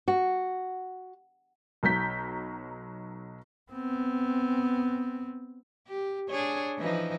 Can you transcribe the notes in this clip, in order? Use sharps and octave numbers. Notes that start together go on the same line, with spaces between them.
F#4
B1 F#3 A#5 G6 B6
B3 C4
G4
D4 G#4 C#5
E3 F3 D#4